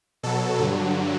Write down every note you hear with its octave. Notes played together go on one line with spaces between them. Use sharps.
B2 F#3 A4
G2 D3 F#3